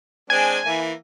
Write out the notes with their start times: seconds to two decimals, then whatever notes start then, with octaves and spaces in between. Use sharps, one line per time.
0.30 G#3 C4 D4 G#5
0.66 E3 A#3 E5